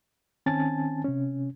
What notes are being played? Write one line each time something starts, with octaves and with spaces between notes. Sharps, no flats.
D#3 C4 C#4 G#5 A5 A6
C3 C#4